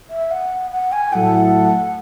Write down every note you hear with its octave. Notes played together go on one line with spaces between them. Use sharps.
E5
F#5
F#5
G#5
A2 F#3 A3 E4 A4 F#5